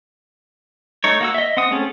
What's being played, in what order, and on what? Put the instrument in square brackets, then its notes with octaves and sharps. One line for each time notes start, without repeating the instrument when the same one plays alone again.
[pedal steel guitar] A3 D#4 C#5
A#3 F#4 E6
D#5 E5
C4 F#5 D#6
A3 C4 C#4 G#4 A4